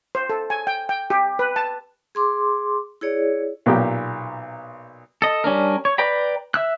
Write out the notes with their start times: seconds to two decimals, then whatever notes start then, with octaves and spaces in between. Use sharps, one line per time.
0.15 C5
0.30 A4
0.50 G#5
0.67 G5
0.89 G5
1.10 G4
1.39 B4
1.56 A5
2.15 G#4 C6 D6
3.01 E4 G#4 C#5 D5
3.66 B1 A#2 G4
5.22 A4 D#5
5.44 G3 C#4 D4 A#4
5.85 C#5
5.98 B4 D5 G5 A#5 B5
6.54 E5 E6 F#6